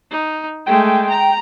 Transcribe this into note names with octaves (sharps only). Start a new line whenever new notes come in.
D#4
G#3 A3 G5
A#5